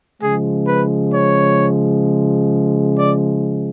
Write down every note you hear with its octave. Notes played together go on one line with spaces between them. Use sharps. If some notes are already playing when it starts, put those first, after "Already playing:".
C#3 F3 G#3 G#4
B4
C#5
D5